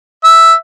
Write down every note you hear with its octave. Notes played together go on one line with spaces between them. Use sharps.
E5